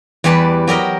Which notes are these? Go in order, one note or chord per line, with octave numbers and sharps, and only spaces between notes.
E2 G3 G4 B4 D5 A5
F#3 G4 A#4 D#5